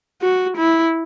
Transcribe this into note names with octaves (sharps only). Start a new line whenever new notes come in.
F#4
E4